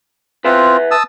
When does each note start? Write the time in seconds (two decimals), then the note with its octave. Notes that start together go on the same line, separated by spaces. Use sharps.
0.45 C4 F4 B4 E5 F#5
0.91 A5 D#6 E6